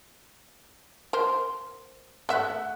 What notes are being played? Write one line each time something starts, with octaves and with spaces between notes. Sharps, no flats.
A#4 C5
A3 E5 F#5 F#6